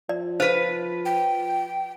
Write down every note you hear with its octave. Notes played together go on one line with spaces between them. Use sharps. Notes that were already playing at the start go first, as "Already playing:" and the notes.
F3 D5
F4 B4 C5
G5